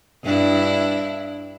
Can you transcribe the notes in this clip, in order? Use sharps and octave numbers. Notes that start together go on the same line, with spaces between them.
G2 D4 E4